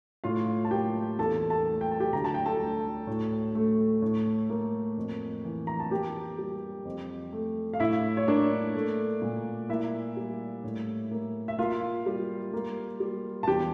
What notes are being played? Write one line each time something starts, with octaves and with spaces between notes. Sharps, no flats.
A2 F4 F5
A5
A#3 G4 G5
E2 A4 A5
A4 A5
A3
G5
A5
G4 G5
D2 A#5
A5
G5
A4 A5
A3
A2
A3
A2
A#3
F2
E3
A#5
A5
A#3 G4 G5
G3
F2
A3
F5
A2 E4 E5
C#5
A#3 D4 D5
A3
A#2
A#3 E4 E5
G3
A2
A#3
E5
A#3 F4 F5
G3
A#3
G3
A5
E2 G4 G5